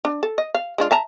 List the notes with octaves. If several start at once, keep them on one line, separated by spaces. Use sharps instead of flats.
D4
A4
D#5
F5
G#3 D4 F4
E5 A5 A#5